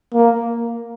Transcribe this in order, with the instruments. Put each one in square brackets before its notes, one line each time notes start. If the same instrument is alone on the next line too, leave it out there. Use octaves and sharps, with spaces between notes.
[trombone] A#3